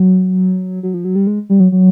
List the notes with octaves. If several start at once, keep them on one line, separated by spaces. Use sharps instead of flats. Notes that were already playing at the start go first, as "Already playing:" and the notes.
Already playing: F#3
F#3
F3
F#3
G3
G#3
G3
F#3
F#3